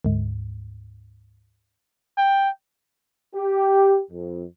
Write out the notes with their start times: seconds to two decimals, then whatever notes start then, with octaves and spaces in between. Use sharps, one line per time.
0.05 D2 G#2
2.17 G5
3.35 G4
4.11 F2